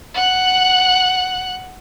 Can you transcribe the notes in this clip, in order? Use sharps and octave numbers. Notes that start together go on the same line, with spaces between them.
F#5 F#6